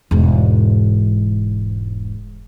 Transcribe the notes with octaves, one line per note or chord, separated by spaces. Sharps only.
E1 G#2